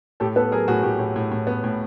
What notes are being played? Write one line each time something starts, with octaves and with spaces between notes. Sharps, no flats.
A2 G4 A4
B3 A4 B4
F#3 G#4 A#4
A2 F#4 G#4
A2 G4
A2
A2
A2
B3
A2